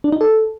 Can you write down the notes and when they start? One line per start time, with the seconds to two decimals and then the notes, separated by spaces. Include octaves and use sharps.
0.04 D4
0.12 D#4
0.21 A4